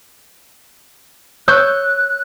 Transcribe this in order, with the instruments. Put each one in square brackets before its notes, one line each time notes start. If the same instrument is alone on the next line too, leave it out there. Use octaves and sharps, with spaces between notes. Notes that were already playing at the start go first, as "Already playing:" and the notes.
[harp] C#5 E6 G6 [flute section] F#6